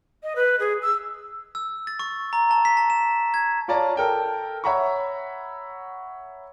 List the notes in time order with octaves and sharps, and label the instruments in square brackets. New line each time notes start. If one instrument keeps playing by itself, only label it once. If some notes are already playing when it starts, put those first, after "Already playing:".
[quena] D#5
B4
G#4
E6
[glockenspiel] E6
A6
C#6
A#5
A5
B6
A5
E7
G#6
[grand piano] F4 C#5 D5 A5 A#5
A4 A#4 G5 A5
C#5 E5 F#5 A#5 B5 C#6